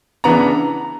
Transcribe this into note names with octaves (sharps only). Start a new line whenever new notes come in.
C#3 E3 B3 D4 A#5